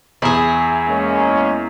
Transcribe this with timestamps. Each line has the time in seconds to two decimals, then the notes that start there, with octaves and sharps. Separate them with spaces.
0.22 E2 E4 G#4
0.87 G#3 A#3 C#4